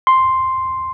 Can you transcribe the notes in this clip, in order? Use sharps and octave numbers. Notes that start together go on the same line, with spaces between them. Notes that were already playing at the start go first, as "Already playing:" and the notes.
C6